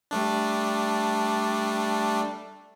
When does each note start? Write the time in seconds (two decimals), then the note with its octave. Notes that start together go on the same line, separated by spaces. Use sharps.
0.11 G3 A3 D4